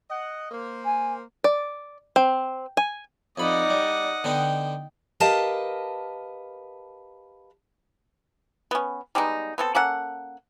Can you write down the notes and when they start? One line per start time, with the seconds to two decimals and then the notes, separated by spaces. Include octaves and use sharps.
0.10 D#5 F#5
0.51 A#3 C5
0.84 G#5
1.44 D5
2.16 C4
2.77 G#5
3.38 F2 D#4 D5 D#5 F#5 B5
3.70 G3
4.24 D3 B3 D#4 G5
5.20 G4 A#4 B4 D#5 F5 A5
8.71 B3 C#4
9.15 G3 G#3 B3 D#4
9.58 B3 C4 A4
9.75 A#3 C#4 A4 F#5